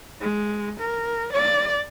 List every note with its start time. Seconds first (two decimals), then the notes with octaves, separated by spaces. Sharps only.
0.21 G#3
0.80 A#4
1.33 D5